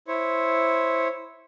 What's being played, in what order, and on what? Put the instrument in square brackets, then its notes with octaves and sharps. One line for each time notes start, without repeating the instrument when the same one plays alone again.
[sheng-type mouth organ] E4 C5 C#5